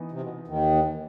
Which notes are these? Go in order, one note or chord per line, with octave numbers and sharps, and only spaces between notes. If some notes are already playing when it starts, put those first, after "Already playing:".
Already playing: E3 B3 D#4
C3
B2
D#2 D#3